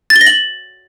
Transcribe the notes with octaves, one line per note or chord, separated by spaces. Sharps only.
A6
G7
A#6
F#7